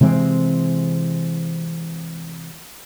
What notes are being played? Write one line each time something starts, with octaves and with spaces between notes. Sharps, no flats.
C3 E3 G#3 C4